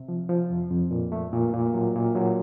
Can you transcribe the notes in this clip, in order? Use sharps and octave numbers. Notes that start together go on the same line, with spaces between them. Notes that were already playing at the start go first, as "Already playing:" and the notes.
Already playing: C3
F3
F3
F2
F2
A#2
A3
A#2
A#2
F#3
A#2
F#3